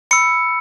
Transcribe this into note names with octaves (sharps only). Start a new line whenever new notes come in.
B5 E6 C#7